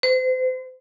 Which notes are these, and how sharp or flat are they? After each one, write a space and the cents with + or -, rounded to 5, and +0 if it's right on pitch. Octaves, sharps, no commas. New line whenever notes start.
C5 -35